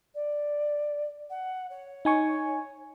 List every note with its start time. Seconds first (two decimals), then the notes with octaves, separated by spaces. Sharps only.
0.15 D5
1.30 F#5
1.70 C#5
2.05 D#4 G#5 C#6